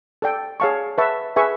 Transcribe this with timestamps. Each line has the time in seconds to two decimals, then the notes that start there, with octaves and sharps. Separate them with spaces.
0.22 A4 D5 G5
0.60 G#4 C#5 F5 A5 C#6
0.98 B4 E5 A5 C#6
1.36 G#4 B4 E5 G#5 C#6